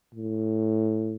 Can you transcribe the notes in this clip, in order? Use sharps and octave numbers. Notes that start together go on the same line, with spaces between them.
A2